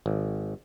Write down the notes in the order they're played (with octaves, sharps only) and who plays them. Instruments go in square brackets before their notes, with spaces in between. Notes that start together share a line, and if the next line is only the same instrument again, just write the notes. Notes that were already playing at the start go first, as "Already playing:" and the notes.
[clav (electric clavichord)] G#1